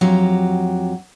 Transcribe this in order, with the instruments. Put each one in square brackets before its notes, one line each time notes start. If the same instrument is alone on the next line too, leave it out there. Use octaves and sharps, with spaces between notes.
[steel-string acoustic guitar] F2 F#3 G4 A#5